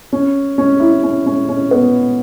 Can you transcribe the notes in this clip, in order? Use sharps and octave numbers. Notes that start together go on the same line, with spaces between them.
C#4
C#4
E4
C#4
C#4
C#4
B3